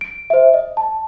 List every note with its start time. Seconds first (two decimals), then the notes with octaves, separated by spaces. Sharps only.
0.01 D7
0.30 C5 E5
0.54 D#5
0.77 A5